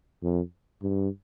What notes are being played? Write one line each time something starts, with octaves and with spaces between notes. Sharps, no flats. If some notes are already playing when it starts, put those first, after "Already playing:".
F2
G2